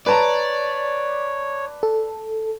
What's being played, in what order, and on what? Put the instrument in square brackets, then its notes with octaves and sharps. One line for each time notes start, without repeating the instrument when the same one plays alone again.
[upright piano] B4 A5 A#5 [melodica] C#5 [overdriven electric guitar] D5
[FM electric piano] A4